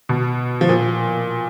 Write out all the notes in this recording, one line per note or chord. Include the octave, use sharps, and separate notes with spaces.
B2
F3
A#2